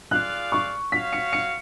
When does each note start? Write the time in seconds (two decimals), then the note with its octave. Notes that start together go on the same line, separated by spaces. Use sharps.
0.11 F4 G#4 D5 F5 F#6
0.52 C#6
0.92 F#4 C#5 F5 B6
1.13 C#7
1.33 C#7